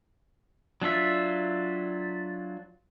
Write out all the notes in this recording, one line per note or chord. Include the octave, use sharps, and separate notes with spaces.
F#3 D4 F4 E5